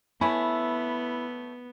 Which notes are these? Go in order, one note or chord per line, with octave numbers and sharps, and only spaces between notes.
E3 A3 B3 C#4 E4 B5